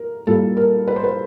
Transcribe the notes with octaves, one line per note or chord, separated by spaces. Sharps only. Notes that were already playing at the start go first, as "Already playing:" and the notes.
Already playing: A#4
A#2 G3 A4
A#4
B4
C5
B4